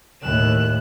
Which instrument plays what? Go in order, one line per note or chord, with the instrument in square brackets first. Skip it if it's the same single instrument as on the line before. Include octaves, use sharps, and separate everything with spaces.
[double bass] D#2 A2 [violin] F#6 E7